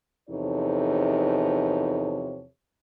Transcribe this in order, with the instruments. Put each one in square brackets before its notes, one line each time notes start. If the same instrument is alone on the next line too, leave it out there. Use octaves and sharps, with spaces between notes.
[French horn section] E2 C3 F3 D#4 A4 C#5